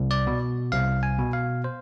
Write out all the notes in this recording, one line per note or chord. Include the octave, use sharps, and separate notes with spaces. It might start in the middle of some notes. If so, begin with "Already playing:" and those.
Already playing: C2
D5
B2
C2 F5
G#5
B2
F5
C5